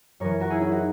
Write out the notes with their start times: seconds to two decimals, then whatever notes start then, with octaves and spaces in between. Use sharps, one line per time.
0.20 F#2 E3 A#4 C#5
0.40 F#4 A#4
0.50 E4 G#4
0.61 C#4 E4
0.71 D#4 F#4